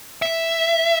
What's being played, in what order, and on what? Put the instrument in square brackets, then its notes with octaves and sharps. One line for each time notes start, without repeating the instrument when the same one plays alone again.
[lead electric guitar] E5